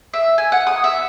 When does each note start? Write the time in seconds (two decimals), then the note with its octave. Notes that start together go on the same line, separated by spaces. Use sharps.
0.13 E5
0.38 G#5
0.52 F#5
0.67 D#6
0.84 E5